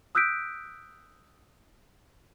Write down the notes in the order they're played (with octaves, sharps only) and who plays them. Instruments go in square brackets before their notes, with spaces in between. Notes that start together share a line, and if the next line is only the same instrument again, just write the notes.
[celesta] D#6 E6 F#6 G6 B6 D7